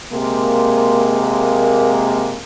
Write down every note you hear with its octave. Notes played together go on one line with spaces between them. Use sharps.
C3 G#3 A#3